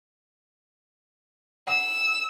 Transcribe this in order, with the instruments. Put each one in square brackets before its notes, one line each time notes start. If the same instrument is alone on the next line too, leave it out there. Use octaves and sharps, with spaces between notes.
[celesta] F#5 [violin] E6